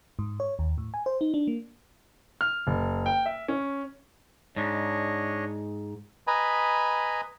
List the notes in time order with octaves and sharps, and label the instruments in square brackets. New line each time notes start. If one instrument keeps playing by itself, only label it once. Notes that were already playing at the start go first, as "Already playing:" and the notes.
[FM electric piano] G#2
C#5
D#2
A2
G#5
C5
D#4
D4
A#3
[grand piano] F6
F#1
G5
E5
C#4
[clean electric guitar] G#2 [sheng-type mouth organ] D4 C#5 D#5
[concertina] B4 D#5 G#5 A#5 B5